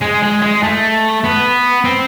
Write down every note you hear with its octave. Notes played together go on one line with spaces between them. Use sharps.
G#3
G#3
G#3
A3
B3
C4